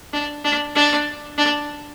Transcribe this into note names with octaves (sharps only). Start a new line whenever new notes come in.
D4
D4
D4
D4